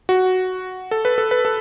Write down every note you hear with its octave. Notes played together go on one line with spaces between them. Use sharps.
F#4
A4
B4
A4
B4
A4